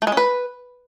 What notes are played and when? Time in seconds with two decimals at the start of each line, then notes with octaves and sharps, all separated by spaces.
0.02 A3
0.07 G#3
0.12 C#4
0.17 B4